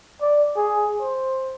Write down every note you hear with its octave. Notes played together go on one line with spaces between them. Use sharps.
D5
G#4
C5